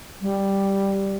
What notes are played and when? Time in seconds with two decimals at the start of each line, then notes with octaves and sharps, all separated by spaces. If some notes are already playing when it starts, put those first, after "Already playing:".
0.22 G3